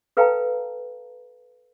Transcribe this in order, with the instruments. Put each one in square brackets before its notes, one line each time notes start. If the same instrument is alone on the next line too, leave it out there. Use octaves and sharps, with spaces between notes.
[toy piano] A4 B4 F5 G5 A5 A#5